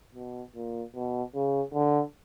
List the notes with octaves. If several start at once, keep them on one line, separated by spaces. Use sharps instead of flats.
B2
A#2
B2
C#3
D3